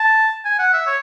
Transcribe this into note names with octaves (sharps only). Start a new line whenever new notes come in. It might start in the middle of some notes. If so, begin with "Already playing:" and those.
Already playing: A5
G#5
F#5
E5
C#5